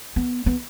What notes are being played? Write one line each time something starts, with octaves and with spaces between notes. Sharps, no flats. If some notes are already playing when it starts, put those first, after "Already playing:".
B3
B3